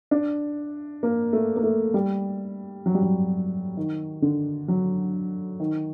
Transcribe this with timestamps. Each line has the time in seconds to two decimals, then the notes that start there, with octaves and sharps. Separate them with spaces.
0.11 D4
1.03 A#3
1.33 A3
1.56 A#3
1.63 A3
1.94 G3
2.86 F#3
2.94 G3
3.03 F#3
3.77 D#3
4.22 D3
4.68 F#3
5.60 D#3